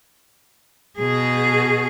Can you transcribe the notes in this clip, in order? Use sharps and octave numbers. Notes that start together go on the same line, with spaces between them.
B2 G#4